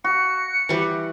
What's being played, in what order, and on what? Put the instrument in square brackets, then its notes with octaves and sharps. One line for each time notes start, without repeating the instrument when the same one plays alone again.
[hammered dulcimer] F#4 [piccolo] C#7
[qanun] E3 G3